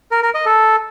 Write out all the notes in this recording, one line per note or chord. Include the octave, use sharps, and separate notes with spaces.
A#4
A#4
D#5
A4